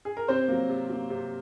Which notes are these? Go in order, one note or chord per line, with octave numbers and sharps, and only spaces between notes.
G#4
A#4
C3 C4 C5
F#3 A#3
C3
F#3 A#3
C3